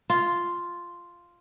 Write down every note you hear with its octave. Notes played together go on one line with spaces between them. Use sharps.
F4